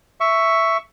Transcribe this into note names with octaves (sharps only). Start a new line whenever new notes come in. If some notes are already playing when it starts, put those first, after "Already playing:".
E5 C#6